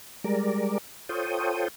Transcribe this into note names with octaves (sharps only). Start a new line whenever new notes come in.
G3 G#3 A#4 D5
F4 A4 C5 C#5 G5 D#6